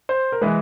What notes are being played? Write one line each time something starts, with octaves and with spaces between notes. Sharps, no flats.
C5
A#4
E3 G#3 B4